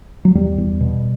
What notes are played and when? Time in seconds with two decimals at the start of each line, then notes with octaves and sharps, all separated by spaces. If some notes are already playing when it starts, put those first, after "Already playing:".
0.25 F#3
0.35 E2 G3
0.58 E2
0.80 B2